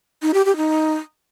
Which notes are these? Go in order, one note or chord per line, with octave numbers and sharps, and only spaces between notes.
D#4
G4
G4
D#4